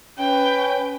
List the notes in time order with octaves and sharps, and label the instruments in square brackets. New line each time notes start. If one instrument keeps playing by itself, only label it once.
[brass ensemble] C#4 [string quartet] B4 [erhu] G5